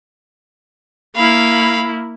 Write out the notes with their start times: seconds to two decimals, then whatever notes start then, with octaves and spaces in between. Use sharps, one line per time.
1.16 A#3 E4 F5 B5